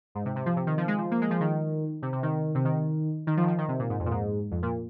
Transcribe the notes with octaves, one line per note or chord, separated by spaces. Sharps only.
G#2
C3
C3
F3
C3
D#3
F3
G#3
F3
A#3
G#3
F3
D#3
C3
C3
D#3
C3
D#3
D#3
F3
D#3
F3
D#3
C3
A#2
G#2
F2
A#2
G#2
F2
A#2